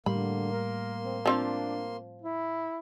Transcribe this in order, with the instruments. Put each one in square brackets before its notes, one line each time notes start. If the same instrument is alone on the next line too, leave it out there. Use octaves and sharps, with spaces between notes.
[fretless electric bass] A2 G3 [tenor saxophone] D3 [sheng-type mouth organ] A#3 C6 [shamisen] B5
[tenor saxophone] A#4
C4
[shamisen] F3 C4 F5 [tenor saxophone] D4
[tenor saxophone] E4